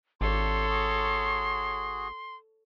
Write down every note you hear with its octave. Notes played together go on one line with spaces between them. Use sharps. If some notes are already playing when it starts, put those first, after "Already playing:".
G#1 D4 F4 G4 A4 C#5 C6
F#4 G#4